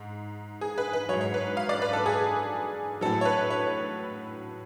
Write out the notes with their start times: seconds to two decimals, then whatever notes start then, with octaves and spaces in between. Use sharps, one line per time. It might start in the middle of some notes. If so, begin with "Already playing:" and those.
Already playing: G#2
0.61 G#4
0.78 B4
0.93 B4
1.09 F#3 C#5
1.13 G#2
1.21 C#5
1.34 B4
1.57 F5
1.69 D5
1.82 B4
1.93 A4
2.06 G#4
3.01 A2 F#3 A4
3.21 C#5
3.25 B4
3.50 C#5